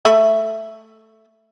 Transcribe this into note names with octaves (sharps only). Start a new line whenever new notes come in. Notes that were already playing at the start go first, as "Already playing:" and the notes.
A3 E5 B5